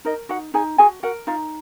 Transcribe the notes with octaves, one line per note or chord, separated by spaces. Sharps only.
D#4 A#4 D#5
D#4 F#4 F#5
D#4 G#4 G#5
F#4 G#4 G#5
F#4 A#4 F#5
D#4 F4 F5